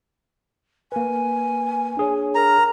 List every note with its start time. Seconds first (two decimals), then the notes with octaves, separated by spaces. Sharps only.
0.92 A#3 B4 G#5
1.97 D4 G#4 C#5
2.35 A#4 A#5